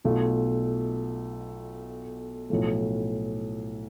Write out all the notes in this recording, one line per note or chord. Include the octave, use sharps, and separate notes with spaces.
B1 B2 A3 F4
B1 A2 F3 A3